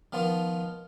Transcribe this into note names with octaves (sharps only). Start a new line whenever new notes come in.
D#3 F3 B3 F4